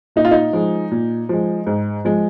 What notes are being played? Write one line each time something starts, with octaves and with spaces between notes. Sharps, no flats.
A#2 D#4
F4
D#4
F3 G#3
A#2
F3 G#3
G#2
F3 G#3